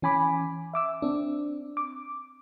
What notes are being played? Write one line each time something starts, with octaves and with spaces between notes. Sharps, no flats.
E3 C#4 G#5 B5 D6
E5 D6 E6
C4 D4
D6